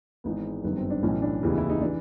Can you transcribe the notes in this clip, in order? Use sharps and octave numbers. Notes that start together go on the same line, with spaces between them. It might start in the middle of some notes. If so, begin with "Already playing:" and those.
G#1 G#2 E3 B3
G1 F#2 D#3 B3
C4
D4
B1 A2 E3 C#4
D4
F1 D#2 C#3 E3
E4
D#4
E3 D4